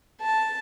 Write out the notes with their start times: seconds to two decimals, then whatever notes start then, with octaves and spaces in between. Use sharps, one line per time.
0.21 A5